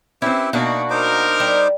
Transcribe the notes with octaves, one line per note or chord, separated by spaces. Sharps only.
C4 C#4 E4 G4 B4 E5
B2 A#3 D4 D#4 F#4
D#4 A#4 C5 D6
G3